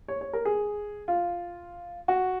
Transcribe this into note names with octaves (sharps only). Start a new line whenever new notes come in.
C#5
C#5
A#4
G#4
F4
F#4